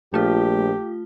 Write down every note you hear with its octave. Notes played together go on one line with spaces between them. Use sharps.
A#1 A3 F4 G4